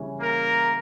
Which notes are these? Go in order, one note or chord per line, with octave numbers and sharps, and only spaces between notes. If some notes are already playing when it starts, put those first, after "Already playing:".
Already playing: C#3 E3 G3 C#4 E4
A#3 A#4